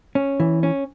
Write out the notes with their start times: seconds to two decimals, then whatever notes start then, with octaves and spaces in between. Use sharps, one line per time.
0.15 C#4
0.40 E3
0.63 C#4